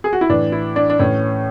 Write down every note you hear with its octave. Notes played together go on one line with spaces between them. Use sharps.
G#4
F#4
E4
A2 E3 D4
E4
D4
D4
A2 E3 C#4